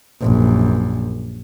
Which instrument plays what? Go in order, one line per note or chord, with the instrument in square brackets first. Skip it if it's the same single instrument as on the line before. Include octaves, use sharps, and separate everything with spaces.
[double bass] A#1 F#2